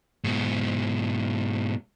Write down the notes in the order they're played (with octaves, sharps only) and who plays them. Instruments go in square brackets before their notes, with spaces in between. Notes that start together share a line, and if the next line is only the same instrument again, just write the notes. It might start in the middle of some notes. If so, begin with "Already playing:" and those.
[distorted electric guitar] G#2 B2